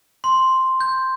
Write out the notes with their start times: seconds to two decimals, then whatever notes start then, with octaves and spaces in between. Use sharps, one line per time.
0.24 C6
0.81 G6